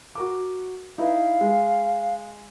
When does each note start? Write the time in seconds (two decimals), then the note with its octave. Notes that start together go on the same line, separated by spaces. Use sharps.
0.15 F#4 A#4 D6
0.98 D#4 E4 B4 F5
1.41 G#3